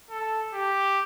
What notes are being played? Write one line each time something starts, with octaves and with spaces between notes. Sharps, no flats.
A4
G4